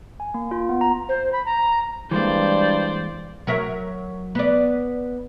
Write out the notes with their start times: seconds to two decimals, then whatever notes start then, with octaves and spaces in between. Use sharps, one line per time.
0.20 G#5
0.34 A#3
0.51 F4
0.69 B3
0.81 A#5
1.09 C5
1.33 B5
1.46 A#5
2.11 G2 E3 G#3 A#3 C5 D5
3.47 F#3 A#4 E5
4.35 B3 D5